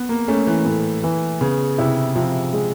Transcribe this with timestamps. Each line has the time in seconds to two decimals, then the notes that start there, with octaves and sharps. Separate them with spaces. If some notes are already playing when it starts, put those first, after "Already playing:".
Already playing: B3
0.09 A#3
0.28 A3 C#4
0.47 E3
0.65 A2
1.03 E3
1.41 C#3 B3
1.78 C3 E4
2.16 C3 F3
2.53 G#3